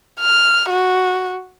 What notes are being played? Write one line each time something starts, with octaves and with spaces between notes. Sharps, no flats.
F6
F#4